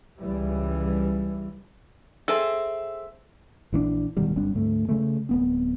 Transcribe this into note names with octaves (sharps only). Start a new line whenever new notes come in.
C#2 E3 G3
C4 G#4 A4 E5
A#1 E3 C4 D4
D1 B2 D#3 G3
G1 G3 C4 D4
D2 G#2 A3
C#3 G#3 A3
D1 B3 C4